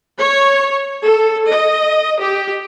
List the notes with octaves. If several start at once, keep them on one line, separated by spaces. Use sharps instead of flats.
C#5
A4
D#5
G4